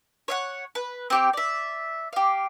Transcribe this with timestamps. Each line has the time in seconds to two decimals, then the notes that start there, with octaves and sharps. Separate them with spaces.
0.28 C#5 F5 F#5
0.75 B4
1.10 C4 G4 G5
1.33 D5 E5
2.13 G4 F5